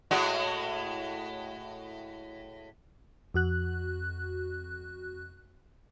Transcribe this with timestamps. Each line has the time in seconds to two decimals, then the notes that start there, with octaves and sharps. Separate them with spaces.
0.11 A2 G#3 F#4
3.34 F2 F#4 F#6